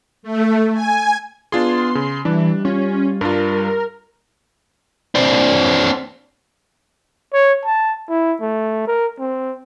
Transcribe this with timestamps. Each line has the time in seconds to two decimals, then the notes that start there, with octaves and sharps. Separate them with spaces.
0.23 A3
0.73 G#5
1.52 B3 D4 F4 G#4 C6
1.95 C#3
2.25 E3 G3 D4
2.65 C#4 F4
3.21 G2 D4 F4 A#4
5.15 C4 D4
7.33 C#5
7.65 A5
8.09 E4
8.41 A3
8.87 A#4
9.19 C4